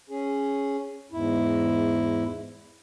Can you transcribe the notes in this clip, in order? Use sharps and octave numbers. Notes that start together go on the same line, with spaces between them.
C#4 G#4
E2 G#2 E4